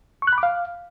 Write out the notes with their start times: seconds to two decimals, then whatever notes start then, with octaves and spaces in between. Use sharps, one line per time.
0.22 C#6
0.27 F#6
0.33 B5
0.38 D6
0.43 F5